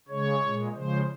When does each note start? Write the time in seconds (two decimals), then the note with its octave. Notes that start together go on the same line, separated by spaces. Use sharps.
0.08 C#3 G#3 C#5
0.42 A#2 G#3
0.74 C#3 F3 G#3 C5